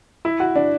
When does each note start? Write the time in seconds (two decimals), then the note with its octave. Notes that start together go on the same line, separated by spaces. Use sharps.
0.25 E4
0.40 F#4
0.56 D4